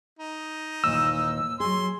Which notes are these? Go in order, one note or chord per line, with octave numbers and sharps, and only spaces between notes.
D#4
D#2 A#2 E3 E6
F#3 G#4 C6